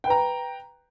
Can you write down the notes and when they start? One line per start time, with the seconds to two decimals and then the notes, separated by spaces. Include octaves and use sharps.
0.04 G5
0.07 B4
0.10 A#5